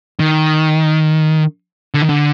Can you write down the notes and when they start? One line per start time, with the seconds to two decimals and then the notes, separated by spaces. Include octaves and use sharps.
0.20 D#3
1.94 D3
2.02 D#3
2.09 D3